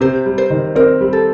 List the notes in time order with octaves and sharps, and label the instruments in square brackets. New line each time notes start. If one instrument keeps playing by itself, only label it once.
[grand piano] C3 [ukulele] C5
[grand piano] G3
[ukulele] C5
[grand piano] D#3
[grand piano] C4 [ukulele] A#4
[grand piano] G3
[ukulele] A4